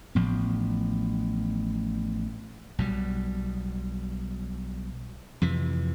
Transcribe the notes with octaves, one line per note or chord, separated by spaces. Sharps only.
A1 A2 F3 B3
B1 B2 G3
F2 C3 E3